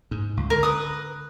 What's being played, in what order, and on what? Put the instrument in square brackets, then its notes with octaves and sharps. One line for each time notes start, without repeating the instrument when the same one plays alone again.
[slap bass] G#2
C#2
[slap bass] D3 [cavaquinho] A#4
[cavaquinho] B4 D#6